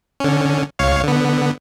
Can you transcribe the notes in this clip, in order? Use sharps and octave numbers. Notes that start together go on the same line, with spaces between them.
D3 C#4
C#2 C#5 F5
D3 B3